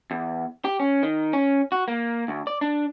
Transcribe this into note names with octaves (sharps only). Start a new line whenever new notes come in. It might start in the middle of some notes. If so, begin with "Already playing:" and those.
E2
G4
C#4
D#3
C#4
F#4
A#3
D2
D5
D4